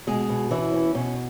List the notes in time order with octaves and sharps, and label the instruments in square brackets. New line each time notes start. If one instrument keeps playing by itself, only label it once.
[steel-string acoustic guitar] B2 G#3 G#4
B2
E3 C#4 E4
C#4
B2 C#4